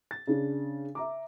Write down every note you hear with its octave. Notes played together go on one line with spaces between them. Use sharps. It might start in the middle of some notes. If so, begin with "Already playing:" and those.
A6
C#3 D4
E5 A#5 D6